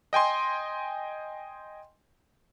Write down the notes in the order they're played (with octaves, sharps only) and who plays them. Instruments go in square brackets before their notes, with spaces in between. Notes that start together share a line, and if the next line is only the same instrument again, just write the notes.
[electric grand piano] D#5 G5 G#5 C6